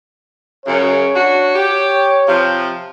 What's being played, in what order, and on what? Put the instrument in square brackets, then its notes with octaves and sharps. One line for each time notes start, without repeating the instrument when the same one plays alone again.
[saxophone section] F#2 C#3 [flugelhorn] C#5
[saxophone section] D4 F#4
G4
C3 F3